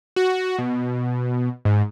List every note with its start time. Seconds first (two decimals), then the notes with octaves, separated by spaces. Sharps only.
0.16 F#4
0.58 B2
1.65 G#2